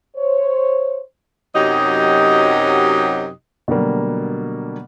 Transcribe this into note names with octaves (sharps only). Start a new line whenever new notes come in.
C5 C#5
F#2 C3 F#3 D#4 G4 D#5
B2 D3 F#3 G3 A#3